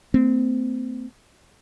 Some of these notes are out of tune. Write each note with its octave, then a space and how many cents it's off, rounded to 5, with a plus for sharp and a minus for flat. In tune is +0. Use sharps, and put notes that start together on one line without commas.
A3 +40 C4 -25